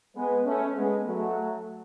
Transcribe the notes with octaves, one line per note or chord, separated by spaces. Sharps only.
G#3 B3
A3 C#4
G#3 B3
F#3 A3